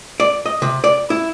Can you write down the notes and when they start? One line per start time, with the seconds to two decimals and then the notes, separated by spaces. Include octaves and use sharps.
0.20 D5
0.46 D#5
0.62 C3
0.84 D5
1.10 E4